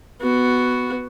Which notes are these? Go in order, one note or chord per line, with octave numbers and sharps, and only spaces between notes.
B3 F#4